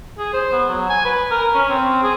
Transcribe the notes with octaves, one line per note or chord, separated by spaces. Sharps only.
G#4
C5
B3
F#3
G#5
B4
A#4
C#4
C4
G#4